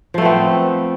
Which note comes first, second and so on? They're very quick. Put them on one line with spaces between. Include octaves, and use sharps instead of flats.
F3 A3 B3 C4